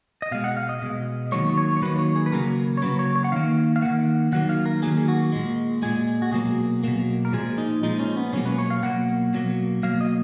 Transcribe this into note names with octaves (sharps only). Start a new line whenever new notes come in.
D#5
B2 G#3 F5
F#5
F5
D#5
B2 G#3
D#3 F#3 A#3 C#5
C#5
C#5
D#3 F#3 A#3 B4
C#5
G#4
B4
C#3 F#3 A#3 A#4
C#5
C#3 F#3 A#3 B4
C#5
C#5
F#5
D#3 A#3 F5
F5
D#3 A#3 F#5
D#3 F#3 A#3 F#5
F5
A#4
D#3 F#3 A#3 G#4
G#4
F#4
A#2 G#3
A#2 G#3 G#4
F#4
B2 F#3 A#3 G#4
B2 F#3 A#3
A#4
A#2 F3 G#3 G#4
D#4
A#2 F3 G#3 D#4
C#4
B3
B2 F#3 A#3 C#4
B4
C#5
F5
B2 F#3 A#3 F#5
B2 F#3 A#3
B2 F#3 A#3 F5
D#5